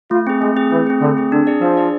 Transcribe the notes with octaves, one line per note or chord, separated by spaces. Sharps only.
A3 F4
C4 G#4
G#3 A3
C4 G#4
E3 A3
C4 G#4
D3 A3
C4 G#4
D3 D4
G#4 D5
F3 D4
G#4 D5